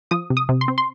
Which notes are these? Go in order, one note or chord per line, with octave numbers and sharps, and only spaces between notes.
F3 D#6
C3
D#6
C3
C6
C4
C6